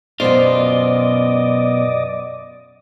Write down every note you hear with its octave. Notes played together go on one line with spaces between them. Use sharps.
F#2 B2 B3 F4 C5 D5 D#5